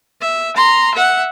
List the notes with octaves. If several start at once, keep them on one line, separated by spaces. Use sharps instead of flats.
E5
A#5 C6
E5 F#5